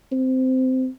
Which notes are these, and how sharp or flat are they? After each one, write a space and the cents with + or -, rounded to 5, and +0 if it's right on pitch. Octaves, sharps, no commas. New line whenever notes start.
C4 -15